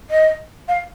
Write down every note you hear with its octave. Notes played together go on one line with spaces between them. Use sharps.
D#5
F5